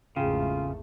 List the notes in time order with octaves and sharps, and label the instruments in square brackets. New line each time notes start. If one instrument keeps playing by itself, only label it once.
[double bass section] G#1 E2 A3 [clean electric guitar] C#3 [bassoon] F4 [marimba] G#4 G5